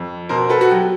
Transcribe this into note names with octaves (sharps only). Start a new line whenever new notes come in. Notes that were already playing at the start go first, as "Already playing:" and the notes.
Already playing: F2
B2 A#4 C5
A4 B4
F#4
F#3 G4